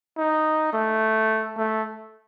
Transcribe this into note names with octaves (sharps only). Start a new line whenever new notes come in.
D#4
A3
A3